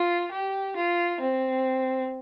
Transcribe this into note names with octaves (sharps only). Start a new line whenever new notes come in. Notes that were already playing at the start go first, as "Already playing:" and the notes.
Already playing: F4
G4
F4
C4